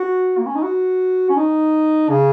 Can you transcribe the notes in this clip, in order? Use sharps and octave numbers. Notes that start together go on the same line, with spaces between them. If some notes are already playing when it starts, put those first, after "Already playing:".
Already playing: F#4
A#3
C#4
D#4
F#4
C#4
D#4
C#3